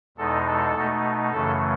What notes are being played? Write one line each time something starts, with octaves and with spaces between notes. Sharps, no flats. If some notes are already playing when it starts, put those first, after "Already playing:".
E2 B2 G#3 D#4 A4
A4
B2 A3 D#4
F#2 C#3 E3 A3 A4